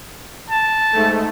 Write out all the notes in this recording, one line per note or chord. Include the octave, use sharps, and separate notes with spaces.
A5
G#2 A3